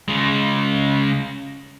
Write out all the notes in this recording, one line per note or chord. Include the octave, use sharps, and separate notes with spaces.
C#3 G#3